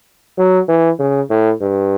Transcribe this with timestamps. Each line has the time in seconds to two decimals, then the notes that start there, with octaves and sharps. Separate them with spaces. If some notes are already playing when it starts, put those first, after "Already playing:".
0.38 F#3
0.68 E3
1.00 C#3
1.30 A2
1.62 G2